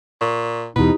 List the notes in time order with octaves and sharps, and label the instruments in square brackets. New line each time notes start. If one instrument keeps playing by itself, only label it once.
[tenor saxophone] A#2 [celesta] C#6
[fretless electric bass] E2 B2 [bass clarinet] D#4 [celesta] E4 G4 [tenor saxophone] B4